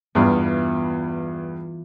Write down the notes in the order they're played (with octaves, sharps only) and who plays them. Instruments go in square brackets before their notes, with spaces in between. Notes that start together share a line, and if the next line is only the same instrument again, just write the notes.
[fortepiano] E2 G2 [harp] E3 B3 F4